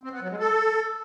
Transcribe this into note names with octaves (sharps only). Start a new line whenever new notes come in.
C4
B3
F#3
G#3
A4